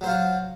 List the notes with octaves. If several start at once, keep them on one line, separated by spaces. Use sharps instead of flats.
F#3 F4 F#4 C5